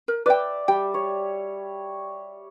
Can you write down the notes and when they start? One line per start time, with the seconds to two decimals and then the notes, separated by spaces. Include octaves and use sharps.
0.08 A#4
0.26 B4 D5 E5 G5
0.68 G3 G5
0.94 C#5